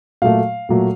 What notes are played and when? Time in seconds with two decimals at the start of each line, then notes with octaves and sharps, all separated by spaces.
0.22 A#2 F#3 A3 F5
0.69 A#2 F#3 A3